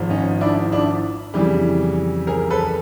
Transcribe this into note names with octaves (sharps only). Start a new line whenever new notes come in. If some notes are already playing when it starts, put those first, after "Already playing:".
Already playing: G#1 G#2 F3
C#4 D#4
D4 E4
D4 E4
F2 C#3 E3 G3
G#4 A#4
A4 B4